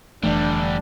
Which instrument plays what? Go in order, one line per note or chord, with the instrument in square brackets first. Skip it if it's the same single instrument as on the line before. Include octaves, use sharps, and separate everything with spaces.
[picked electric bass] F1 E3 A3 [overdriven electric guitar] D3 G3 [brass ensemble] D4